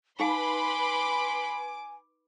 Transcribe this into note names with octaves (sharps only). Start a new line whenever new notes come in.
D#4 B4 F5 G#5 B5 C6 D6